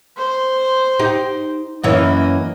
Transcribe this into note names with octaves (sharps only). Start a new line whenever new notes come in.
C5
D#4 G4
F#2 E3 A#3 C#4 D#5